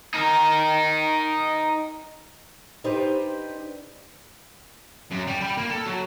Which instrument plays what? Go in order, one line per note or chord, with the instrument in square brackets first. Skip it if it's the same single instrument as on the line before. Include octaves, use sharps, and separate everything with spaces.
[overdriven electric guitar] D#4 A#4
[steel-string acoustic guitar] D4 D#4 G4 B4 C5 D5
[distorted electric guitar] F#2
G3
G5 B5
A#3
A4
F#3